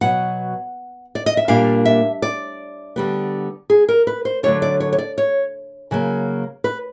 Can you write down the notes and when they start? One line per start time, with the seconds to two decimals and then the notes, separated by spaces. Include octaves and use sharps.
0.01 B2 F#3 B3 F#5
1.15 D5
1.26 D#5
1.37 E5
1.48 A#2 G3 A#3 D4 F5
1.85 E5
2.22 D5
2.96 D3 G3 B3
3.70 G#4
3.88 A#4
4.07 B4
4.25 C5
4.43 D3 F#3 A3 D4 C#5
4.62 D5
4.80 C#5
4.92 C#5
4.98 D5
5.18 C#5
5.91 C#3 F#3 A#3
6.64 B4